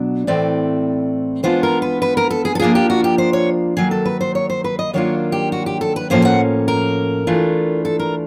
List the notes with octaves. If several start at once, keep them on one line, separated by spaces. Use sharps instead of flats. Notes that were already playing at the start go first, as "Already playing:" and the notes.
Already playing: B2 F#3 D4
A2 E3 A3 C4 D5
E3 G#3 B3 D4 F4 C5
A#4
B4
B4
A#4
A4
G#4
A4
F3 A#3 D4 F4 G#4
G4
F#4
G4
C5
C#5
D#3 F#3 A#3 G#4
A4
B4
C5
C#5
C5
B4
D#5
D#3 F#3 A#3 D4 F4 C#5
G4
F#4
G4
A4
B4
A2 F3 A#3 C#4 C5
F#5
A#4
E3 A3 D4 F4
A4
A#4